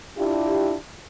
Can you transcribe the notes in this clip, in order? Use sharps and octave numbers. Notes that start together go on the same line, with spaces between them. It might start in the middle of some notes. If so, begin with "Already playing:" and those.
D4 E4 F4 G4